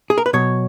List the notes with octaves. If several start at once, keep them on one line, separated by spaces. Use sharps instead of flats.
G#4
A#4
B4
B2 F#3 C#5